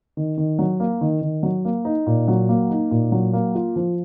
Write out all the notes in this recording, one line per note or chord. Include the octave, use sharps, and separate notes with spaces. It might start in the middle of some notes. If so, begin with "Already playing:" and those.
D#3
D#3
F#3
A#3
D#3
D#3
F#3
A#3
D#4
A#2
F#3
A#3
D#4
A#2
F#3
A#3
F4
F3